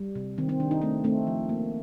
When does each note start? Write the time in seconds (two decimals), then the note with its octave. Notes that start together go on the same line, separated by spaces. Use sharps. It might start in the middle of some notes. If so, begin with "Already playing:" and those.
Already playing: G3
0.15 C3
0.38 D#3 C4
0.49 C4
0.60 D#3 D4
0.71 D#4
0.82 A3 C4
1.04 A3 C4
1.27 F3
1.49 A#3